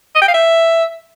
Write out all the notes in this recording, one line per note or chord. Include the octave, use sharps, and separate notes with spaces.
D#5
G5
F5
E5